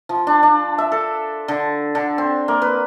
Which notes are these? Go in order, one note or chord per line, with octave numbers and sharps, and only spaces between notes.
F3
D4
D4
E5
A4
D3
D3
C4
A#3
B4